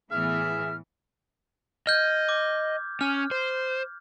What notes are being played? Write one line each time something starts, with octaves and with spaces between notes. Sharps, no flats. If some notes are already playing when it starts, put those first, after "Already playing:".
A2 E3 B3 G#4 E5 F6
D#5 F6 G6 G#6
D6
C#4 F6
C5